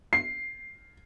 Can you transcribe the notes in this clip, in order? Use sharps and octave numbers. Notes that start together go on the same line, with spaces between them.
C7